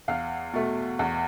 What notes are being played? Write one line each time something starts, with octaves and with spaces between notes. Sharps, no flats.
E2 F5
B2 A3
E2